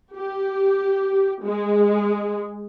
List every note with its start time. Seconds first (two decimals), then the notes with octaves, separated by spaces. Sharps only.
0.17 G4
1.45 G#3